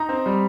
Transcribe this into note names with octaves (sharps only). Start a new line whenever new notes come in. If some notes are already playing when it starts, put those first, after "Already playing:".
Already playing: D#4 A#5
C4
G3